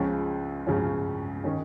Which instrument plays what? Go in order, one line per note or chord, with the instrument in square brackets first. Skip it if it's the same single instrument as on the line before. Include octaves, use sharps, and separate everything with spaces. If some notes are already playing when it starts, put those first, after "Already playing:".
Already playing: [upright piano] C#2 C#3 F3 C#4
C#2 C#3 F3 C#4
D#3 C#4